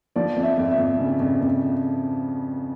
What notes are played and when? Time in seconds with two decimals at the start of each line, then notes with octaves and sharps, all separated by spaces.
0.16 F3 D5
0.36 F2
0.43 E5
0.58 F2
0.71 E5
0.78 F2
0.99 C#3
1.20 F2
1.41 F2